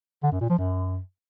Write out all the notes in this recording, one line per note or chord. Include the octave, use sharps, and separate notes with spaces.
D3
F#2
A#2
F3
F#2